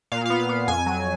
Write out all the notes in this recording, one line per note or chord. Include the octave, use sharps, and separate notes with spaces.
A#2 F5
B3 F5
F5
B3
F2 G#5
F#3